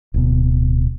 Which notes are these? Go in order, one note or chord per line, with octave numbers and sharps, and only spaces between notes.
D1 B2